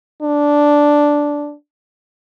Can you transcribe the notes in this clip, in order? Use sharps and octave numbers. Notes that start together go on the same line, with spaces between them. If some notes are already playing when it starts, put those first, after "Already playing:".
D4